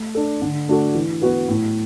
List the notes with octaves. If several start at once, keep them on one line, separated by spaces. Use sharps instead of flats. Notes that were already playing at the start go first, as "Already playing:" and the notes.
Already playing: A3
D4 A4
D3
A3 D4 F#4 A4
E3
B3 F#4 B4
A2